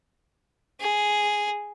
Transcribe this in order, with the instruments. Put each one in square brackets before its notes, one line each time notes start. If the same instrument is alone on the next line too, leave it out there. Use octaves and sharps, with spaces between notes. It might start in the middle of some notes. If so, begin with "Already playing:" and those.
[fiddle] G#4